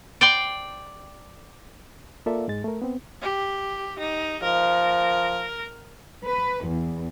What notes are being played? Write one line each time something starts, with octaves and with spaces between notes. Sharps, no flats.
D5 G5 C6
A#3 F4 A4 A#4 D5 E5
G#2 G#3 A6
A3 A#4
B3 C4
G4
D#4
F3 A#4
B4
E2